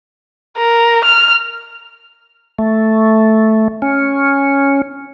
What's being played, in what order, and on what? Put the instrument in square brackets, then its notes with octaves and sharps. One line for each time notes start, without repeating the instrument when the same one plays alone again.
[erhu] A#4
F6
[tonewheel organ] A3
C#4